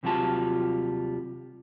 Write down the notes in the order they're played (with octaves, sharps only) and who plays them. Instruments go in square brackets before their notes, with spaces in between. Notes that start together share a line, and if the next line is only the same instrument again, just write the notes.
[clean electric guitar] D#2 C3 F#3 G3 F4 A5